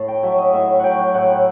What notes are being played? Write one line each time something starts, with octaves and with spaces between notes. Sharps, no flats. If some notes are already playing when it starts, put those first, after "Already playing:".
Already playing: A2 A5
G5
F#3 E5
D#5
A2 E5
F#3 F#5 G5
G5
A2 F#5